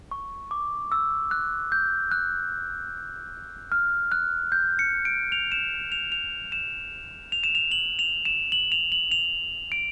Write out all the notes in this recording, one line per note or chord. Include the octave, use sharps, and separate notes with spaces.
C#6
D6
E6
F#6
G6
F#6
F6
F#6
G6
C#7
D7
F7
E7
F7
F7
E7
F7
E7
F7
F#7
F7
E7
F#7
F7
F#7
F7
D7